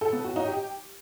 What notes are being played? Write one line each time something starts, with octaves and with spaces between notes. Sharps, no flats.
A4
B3
F#4
D#4
G4